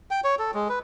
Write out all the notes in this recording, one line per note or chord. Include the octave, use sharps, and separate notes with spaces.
G5
C#5
A4
G#3
B4